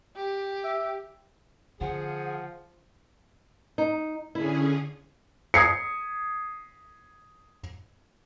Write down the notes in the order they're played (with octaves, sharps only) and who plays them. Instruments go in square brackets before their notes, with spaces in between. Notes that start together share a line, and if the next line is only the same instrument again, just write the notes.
[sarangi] G4
[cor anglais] E5
[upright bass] D3 [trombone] F3 [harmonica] G#4 [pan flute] F#5
[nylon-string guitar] D#4
[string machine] D3 C#4 G#4 [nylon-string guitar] E4
[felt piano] D#6 G#6 C7 C#7